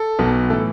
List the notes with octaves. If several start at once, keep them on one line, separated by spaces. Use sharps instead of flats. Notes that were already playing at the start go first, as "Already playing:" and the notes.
Already playing: A4
B1 B2
A2 E3 A4